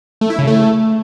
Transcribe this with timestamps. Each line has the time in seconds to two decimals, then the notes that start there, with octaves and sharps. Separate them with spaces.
0.21 A3
0.30 E4
0.39 C#3
0.47 A3